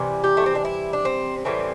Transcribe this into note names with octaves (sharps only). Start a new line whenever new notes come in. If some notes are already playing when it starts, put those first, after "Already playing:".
Already playing: C3 E3 G3
G4
A3
C4
D4
E4
D4
C4
A2 E3 G3 C4